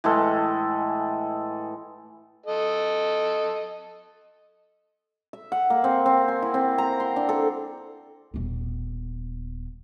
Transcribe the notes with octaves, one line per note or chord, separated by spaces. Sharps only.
A2 E3 G#3 A4
A4 D#5
E5
F#5
A#3
C4
C4
G#5
E4
C4
A#5
C6
D4
A4
D#1 B3